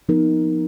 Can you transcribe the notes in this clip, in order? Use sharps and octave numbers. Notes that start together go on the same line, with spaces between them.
F3 B3 D#4 A#4